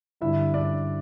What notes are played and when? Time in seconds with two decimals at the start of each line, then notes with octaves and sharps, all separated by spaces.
0.21 G2 D3 G3 E4 E5
0.54 D4 D5